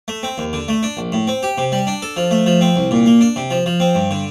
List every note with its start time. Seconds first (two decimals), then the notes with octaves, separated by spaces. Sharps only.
0.08 A3
0.23 C4
0.38 D#2
0.53 D3
0.68 A3
0.83 D4
0.97 A#1
1.12 A2
1.27 C4
1.43 G4
1.58 C3
1.72 G3
1.87 D4
2.02 A4
2.17 F3
2.31 A3
2.46 F3
2.61 C4
2.76 C2
2.91 A#2
3.06 A#3
3.21 D4
3.36 C3
3.51 F3
3.66 F3
3.80 C4
3.95 G2
4.11 D3